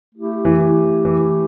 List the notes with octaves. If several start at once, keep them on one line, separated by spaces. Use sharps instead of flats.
A3 E4 G4
E3
E3